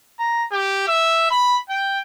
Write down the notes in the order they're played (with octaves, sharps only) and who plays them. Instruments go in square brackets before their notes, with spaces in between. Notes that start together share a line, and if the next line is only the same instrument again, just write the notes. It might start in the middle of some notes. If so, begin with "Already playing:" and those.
[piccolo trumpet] A#5
G4
E5
B5
G5